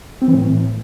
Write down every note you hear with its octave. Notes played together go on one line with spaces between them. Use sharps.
C4
E3
A2